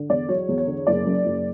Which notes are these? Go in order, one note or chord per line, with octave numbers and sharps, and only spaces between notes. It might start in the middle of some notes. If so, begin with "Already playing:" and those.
Already playing: D3
E2 D5
F#3 C#5
E2
C#5
D3
F#1 D5
F#2
F#1